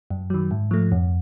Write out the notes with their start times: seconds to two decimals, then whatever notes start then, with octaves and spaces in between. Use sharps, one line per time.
0.10 F#2
0.30 D#3 F#3
0.51 G#2
0.71 F3 A3
0.92 F2